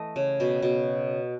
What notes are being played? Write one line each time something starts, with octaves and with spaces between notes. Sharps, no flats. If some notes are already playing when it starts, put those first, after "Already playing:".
Already playing: E3 A3 D#5
C#3
B2
B2